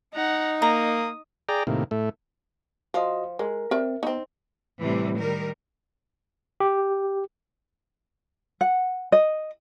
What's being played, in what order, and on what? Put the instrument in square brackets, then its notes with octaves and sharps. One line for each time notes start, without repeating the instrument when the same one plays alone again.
[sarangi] D#4 [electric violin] F#5 A#5
[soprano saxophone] A#3 [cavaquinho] A#5 [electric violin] D#6
[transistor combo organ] G#4 D5 G5 A#5
A2 C3 D#3 A#3
A2 A3
[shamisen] F3 [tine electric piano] F#4 D#5
[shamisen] G#3 [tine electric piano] A#4
[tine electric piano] C4 [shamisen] A#4 D5 E5
[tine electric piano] B3 [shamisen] C4 D#4
[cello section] A2 C3 E3 G3
D#3 G3 A#4
[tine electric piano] G4
[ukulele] F#5
D#5